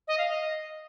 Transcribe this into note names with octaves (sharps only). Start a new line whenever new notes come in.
D#5
F5
D#5